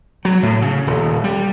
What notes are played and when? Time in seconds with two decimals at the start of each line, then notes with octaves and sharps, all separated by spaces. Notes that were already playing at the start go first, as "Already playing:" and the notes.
0.25 F#3
0.43 A2
0.62 C#3
0.87 D#1
1.24 G3